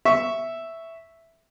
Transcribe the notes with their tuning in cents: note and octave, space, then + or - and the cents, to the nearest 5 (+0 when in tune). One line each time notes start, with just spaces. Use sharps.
E5 +0 C#6 +0